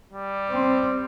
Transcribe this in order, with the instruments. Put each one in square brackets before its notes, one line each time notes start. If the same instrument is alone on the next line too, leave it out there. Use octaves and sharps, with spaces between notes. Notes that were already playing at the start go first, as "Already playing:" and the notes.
[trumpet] G3
[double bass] C4